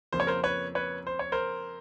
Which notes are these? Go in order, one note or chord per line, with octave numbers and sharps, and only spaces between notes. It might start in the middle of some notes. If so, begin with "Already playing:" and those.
F2 C#3 F3 A#3 C5
C#5
A#4 C5
B4 C#5
B4 C#5
C5
C#5
A#4 C5